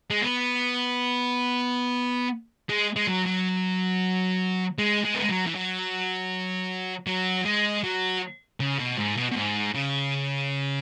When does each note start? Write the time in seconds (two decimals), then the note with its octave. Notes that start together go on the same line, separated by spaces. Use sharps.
0.10 G#3
0.21 B3
2.69 G#3
2.96 G#3
3.07 F#3
3.26 F#3
4.78 G#3
5.05 G#3
5.14 B3
5.22 G#3
5.29 F#3
5.46 E3
5.55 F#3
7.07 F#3
7.45 G#3
7.84 F#3
8.60 C#3
8.79 B2
8.97 G#2
9.17 B2
9.32 B2
9.36 G#2
9.74 C#3